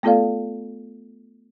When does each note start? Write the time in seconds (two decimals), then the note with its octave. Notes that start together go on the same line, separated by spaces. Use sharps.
0.03 A3 B3 F4 A4 D5 F5